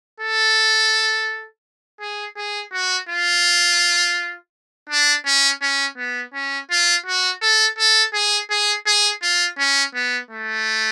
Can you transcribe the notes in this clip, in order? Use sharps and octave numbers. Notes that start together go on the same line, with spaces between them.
A4
G#4
G#4
F#4
F4
D4
C#4
C#4
B3
C#4
F4
F#4
A4
A4
G#4
G#4
G#4
F4
C#4
B3
A3